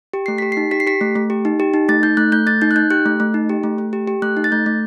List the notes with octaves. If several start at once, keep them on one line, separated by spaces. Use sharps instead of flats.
G4
A3 C7
G4 B6
C7
D#4
G4 B6
C7
G4 B6
A3
A3
G4
D#4
G4
D#4
A3 A6
D#4 G6
A3 F#6
A3 G6
A3 A6
D#4 G6
F#6
D#4 G6
G4 F#6
A3
A3
D#4
G4
A3
A3
G4
G4
A3 F#6
D#4
A6
A3 G6
A3